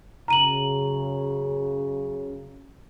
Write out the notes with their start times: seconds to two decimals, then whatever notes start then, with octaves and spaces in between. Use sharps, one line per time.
0.28 F#2 C#3 A#5 D#7 F#7